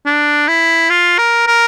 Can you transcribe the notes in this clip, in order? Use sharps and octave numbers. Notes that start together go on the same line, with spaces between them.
D4
E4
F4
A#4
A#4